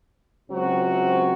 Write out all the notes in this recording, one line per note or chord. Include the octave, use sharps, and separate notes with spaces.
C#2 C3 F#3 C4 F#4